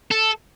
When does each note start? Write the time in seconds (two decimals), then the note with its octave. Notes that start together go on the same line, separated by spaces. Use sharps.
0.11 A4